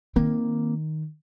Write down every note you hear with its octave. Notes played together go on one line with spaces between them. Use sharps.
D#3 A#3 C4